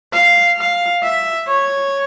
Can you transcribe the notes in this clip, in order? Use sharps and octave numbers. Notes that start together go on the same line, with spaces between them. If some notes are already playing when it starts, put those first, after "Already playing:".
F5
F5
E5
C#5